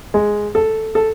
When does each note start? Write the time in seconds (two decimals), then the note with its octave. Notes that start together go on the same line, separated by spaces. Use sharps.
0.14 G#3
0.55 A4
0.95 A4